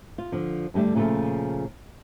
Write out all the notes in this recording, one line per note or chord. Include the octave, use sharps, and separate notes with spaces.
F4
D3 F3
G2 D3 G3 A3 D4
A#2 C#3 F3 A3 F4 A4